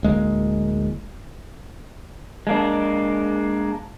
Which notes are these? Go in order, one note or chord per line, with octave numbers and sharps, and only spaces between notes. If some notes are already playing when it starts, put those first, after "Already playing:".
D1 G#3 A#3
G#3 A#3 D4